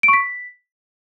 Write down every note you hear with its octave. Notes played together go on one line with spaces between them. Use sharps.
D7
C#6
B6